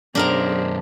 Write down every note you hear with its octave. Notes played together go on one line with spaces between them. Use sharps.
B1 F#2 D4 G#4 A#4 C5 A#5